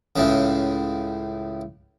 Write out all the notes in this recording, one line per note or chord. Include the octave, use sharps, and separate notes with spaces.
C#2 A2 C#3